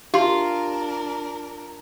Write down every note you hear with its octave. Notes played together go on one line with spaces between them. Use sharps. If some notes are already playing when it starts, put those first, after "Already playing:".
D4 F4 G4 A#4 C6